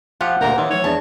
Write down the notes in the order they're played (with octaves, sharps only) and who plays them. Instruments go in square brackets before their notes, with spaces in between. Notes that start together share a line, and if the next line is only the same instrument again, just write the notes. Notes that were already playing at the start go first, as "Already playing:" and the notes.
[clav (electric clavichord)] F3 F4 G4 [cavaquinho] F#5
[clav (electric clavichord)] D2 A#2 [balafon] A#3 F#4 G4 [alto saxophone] A#4
[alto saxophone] D#3 [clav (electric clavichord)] E3 [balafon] C#5 C6
[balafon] F3 G#3 [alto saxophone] C#5
[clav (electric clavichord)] E2 [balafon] D4 G#4 D5 [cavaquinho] A5